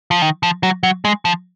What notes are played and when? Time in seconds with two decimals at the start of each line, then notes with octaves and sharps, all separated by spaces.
0.11 F3
0.22 D#3
0.43 F3
0.63 F#3
0.83 F#3
1.05 G#3
1.25 F3